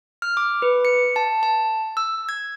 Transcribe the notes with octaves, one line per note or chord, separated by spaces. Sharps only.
F6
D6
B4
C#7
A5
A5
E6
G#6